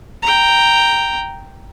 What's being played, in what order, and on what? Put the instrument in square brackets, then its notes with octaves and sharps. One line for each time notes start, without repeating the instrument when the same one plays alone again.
[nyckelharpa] G5 A#5